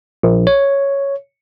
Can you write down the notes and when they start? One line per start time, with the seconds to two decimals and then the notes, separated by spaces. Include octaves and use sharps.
0.23 A#1
0.47 C#5